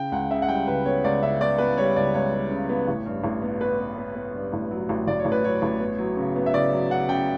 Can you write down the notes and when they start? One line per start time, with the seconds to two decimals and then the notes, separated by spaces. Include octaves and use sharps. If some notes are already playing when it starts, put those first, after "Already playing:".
Already playing: C#3 G5
0.12 C#2 F#5
0.31 C#3 E5
0.42 F#5
0.48 G3 G5
0.67 C#2 B4
0.85 B3 C#5
1.04 C#2 D5
1.22 C#3 E5
1.41 B3 D5
1.58 B3 B4
1.77 G3 C#5
1.96 C#2 D5
2.14 C#2 C#5
2.32 G3
2.51 C#3
2.69 B3
2.88 A1
3.06 G2
3.24 A1
3.42 B3
3.61 B3 B4
3.79 B3
3.97 B3
4.15 B3
4.34 G2
4.53 A1
4.71 F#3
4.89 A1
5.07 A1 D5
5.19 C#5
5.25 A1
5.32 B4
5.43 F#3 C#5
5.62 A1
5.80 B3
5.98 F#3
6.17 C#3
6.36 B3
6.46 E5
6.54 C#3 D5
6.72 F#3
6.91 C#3 F#5
7.09 C#3 G5